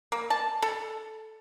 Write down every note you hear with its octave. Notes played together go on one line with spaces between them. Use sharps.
A#3
A5
A4